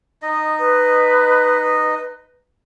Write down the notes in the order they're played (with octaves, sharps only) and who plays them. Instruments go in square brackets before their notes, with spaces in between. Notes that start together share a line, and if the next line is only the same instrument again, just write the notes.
[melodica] D#4 D#5
[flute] B4